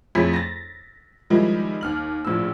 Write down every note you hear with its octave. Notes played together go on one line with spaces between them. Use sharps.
F2 A3 E4 G#4 C#5 B6
A6 A#6
D#3 F3 G3 G#3 D#4 E4
D#2 F6 F#7
A#1 A2 F3 E6